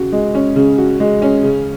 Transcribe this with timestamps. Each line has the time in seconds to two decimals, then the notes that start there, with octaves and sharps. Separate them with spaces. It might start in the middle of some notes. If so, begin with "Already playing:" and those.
Already playing: C#3 F#4
0.12 G#3
0.35 C#4
0.56 C#3
0.78 F#4
1.00 G#3
1.22 C#4
1.44 C#3